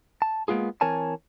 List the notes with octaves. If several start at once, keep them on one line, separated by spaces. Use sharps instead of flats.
A5
G#3 A#3 B3 F4 G#4
E3 C4 A#4 C#5 G#5 A5